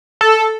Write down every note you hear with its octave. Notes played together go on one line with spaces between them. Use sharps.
A4